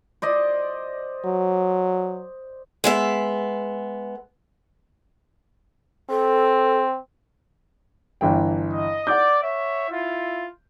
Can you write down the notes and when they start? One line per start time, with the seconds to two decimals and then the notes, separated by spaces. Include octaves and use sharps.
0.22 C5 D5 D#5
1.25 F#3
2.84 G#3 B3 E5
6.10 C4 A4
8.21 G1 E3 G5
8.71 D#5
9.07 D5 F#5 D6 G6
9.42 C#5 E5
9.90 E4 F4